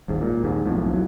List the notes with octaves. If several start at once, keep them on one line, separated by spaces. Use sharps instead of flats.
D#1 G#1 G#2
A#2
D#2 G#2
B1 F2 A2
E1 F#3